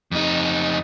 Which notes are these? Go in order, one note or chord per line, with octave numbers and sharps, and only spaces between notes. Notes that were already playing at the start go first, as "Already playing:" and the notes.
F2 D#4